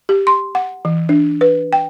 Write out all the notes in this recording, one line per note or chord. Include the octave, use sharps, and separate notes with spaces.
G4
C6
F#5
E3
D4
B4
G5